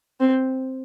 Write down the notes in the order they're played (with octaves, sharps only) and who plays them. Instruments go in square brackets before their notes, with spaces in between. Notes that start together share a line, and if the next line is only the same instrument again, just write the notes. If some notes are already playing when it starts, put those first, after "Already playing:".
[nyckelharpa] C4